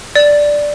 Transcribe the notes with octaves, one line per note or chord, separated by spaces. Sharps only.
D5